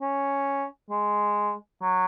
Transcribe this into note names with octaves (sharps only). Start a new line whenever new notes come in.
C#4
G#3
F#3